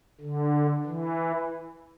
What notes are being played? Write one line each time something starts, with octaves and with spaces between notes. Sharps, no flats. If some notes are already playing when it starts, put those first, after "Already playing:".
D3
E3